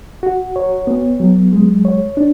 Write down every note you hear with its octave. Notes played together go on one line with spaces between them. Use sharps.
F#4
C#5
B3
F#3
G#3
C#5
D4